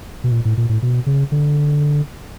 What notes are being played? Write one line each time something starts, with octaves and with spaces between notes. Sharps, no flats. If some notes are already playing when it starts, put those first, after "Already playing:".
B2
A#2
A2
A#2
A2
B2
C#3
D3